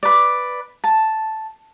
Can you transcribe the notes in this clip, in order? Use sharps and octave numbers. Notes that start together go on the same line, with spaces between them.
B4 D5
A5